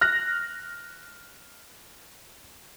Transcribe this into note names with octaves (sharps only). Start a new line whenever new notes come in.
F6 F#6 A#6